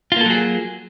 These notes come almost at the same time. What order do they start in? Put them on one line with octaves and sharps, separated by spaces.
F4 A#3 A4 F#3 G#4